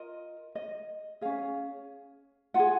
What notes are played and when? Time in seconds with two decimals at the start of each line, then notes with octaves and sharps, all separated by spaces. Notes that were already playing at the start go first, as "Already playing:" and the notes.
Already playing: F4 A#4 D#5
0.55 D#5
1.21 C#4 G#4 F5
2.54 F4 G#4 F#5